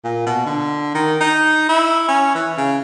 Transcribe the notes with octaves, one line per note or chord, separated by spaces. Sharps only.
A#2
B2
D3
D#3
D#4
E4
C#4
E3
C#3